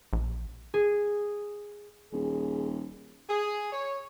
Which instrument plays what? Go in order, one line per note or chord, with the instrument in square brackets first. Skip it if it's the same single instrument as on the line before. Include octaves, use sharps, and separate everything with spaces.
[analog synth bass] A#1
[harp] G#4
[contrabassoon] D#1 [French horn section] G#4
[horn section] G#4
C#5